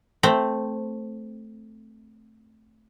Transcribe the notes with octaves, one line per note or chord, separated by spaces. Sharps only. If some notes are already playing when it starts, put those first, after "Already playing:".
A3 C4